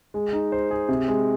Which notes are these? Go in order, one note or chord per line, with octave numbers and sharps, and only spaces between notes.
G#3
D#4
C5
G#4
C3
G#3